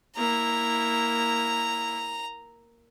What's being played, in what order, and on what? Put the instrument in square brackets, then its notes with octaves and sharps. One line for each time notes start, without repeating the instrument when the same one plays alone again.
[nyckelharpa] A#3 E4 [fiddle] A#5